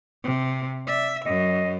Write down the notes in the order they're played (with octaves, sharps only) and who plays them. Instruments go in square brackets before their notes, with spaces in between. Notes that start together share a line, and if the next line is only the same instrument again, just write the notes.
[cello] C3
[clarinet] D5 [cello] E5
[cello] F#2 [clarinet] D#5